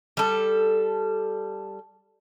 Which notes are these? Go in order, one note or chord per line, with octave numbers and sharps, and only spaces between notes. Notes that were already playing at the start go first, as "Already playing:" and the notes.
G3 A4